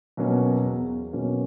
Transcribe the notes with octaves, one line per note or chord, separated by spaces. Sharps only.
B2 F#3 A#3 C#4
E2
B2 F#3 A#3 C#4